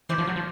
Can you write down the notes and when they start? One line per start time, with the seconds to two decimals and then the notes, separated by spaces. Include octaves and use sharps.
0.09 E3 C5 D5
0.18 F3
0.27 F#3
0.36 F3